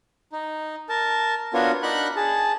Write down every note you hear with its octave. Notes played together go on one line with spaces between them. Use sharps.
D#4
A#4 A5
B3 D4 F4 F#4 A#4 C#5
D4 D#4 A#4 F#5 B5 F#6
G#4 A5